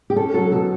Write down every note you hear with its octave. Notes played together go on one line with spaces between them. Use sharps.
G4
C#4 A4
F#3 A4
B2 A4